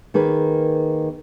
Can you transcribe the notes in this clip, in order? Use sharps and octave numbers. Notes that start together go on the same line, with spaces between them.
D#3 A#3 G#4 B4